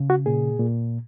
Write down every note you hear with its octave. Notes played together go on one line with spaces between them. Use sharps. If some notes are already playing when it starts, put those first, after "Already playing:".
Already playing: C#3
F#4
A#2 G#4
A#2